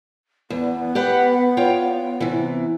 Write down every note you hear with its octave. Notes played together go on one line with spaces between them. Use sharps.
E2 B3
G4 B4 F#5
F4 C#5 G5
C3 E3